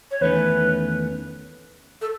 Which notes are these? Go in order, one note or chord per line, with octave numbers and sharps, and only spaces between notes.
C#5
E2 D#3 A3 C#4 B4
A4